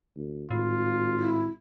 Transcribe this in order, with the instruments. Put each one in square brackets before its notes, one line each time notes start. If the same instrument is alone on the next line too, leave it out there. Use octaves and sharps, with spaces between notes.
[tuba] D2
[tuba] G#1 [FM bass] A2 [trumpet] F4
[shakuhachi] E4